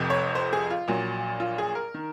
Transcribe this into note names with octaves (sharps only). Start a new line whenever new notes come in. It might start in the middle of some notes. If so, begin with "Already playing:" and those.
Already playing: F1 F2 C3
C#5
C5
G#4
F4
A#1 A#2 F#3
F4
G#4
A#4
D#3